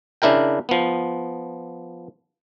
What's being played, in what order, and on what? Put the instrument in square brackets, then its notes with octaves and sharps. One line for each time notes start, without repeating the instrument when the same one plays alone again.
[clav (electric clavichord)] C#3 D4 E4 A#4 G5
F3 B3